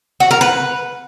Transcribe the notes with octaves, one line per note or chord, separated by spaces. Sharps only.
F#4
A#4
B4